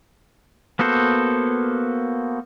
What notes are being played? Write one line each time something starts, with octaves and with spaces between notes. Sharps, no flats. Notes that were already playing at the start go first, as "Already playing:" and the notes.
A#3 B3 F#4 A4 C5